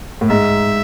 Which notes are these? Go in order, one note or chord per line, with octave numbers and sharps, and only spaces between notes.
A2
G#2 E5